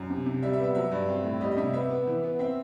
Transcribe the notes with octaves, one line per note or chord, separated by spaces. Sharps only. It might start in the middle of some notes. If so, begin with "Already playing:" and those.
Already playing: F#2
C3
C3
G3 E5
E5
B3
E5
F#3 E5
G2
C4
A2
G3 D#5
D#5
C3 E5
B3 E5
B3
E3
B3
C4 E5